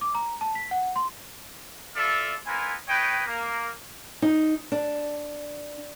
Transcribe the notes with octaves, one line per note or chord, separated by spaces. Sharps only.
D6
A#5
A5
B6
F#5
C6
F4 A4 D5 E5 F5
B3 E4 A#4 C5 G#5
B4 C#5 D#5 G5
A#3
D#4
D4